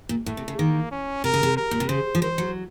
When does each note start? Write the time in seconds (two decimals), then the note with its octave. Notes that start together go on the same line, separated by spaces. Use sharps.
0.09 A#2
0.26 A2 A3
0.37 C3
0.48 C#3
0.59 D#3 A#3
0.91 C#4
1.24 C3 A#4
1.34 C#3
1.43 C3
1.57 A#4
1.71 A#2
1.80 C3
1.89 C#3 C5
2.15 F3
2.22 D#3 C5
2.38 F#3